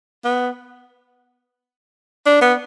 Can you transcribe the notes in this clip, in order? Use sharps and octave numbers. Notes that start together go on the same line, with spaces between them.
B3
D4
B3